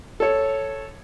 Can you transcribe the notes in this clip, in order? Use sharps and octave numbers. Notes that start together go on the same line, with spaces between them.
A4 C#5